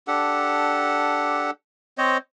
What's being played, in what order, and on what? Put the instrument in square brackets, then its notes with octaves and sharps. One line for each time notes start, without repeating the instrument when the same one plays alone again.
[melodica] D4 G4 A4 F#5
C4 C5 C#5 D#5